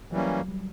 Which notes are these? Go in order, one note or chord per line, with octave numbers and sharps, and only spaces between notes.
E3 F#3 G3 A#3 C#4
G3